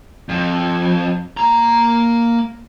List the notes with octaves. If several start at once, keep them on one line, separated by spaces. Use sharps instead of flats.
F2
A#3 A#5